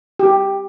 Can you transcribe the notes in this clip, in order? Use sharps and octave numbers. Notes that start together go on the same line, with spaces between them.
G4